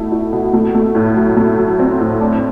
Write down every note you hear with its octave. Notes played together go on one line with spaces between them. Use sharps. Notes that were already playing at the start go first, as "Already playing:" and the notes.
Already playing: B2 A3 E4
E4
B2
A3
A3
A2
F#3
A3
F#3
C4
A2
D4